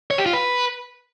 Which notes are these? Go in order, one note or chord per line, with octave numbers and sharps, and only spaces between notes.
C#5
G4
F4
B4